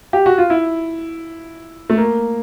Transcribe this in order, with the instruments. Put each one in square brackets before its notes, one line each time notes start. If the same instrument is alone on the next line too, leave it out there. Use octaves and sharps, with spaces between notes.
[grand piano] G4
F#4
F4
E4
A3
A#3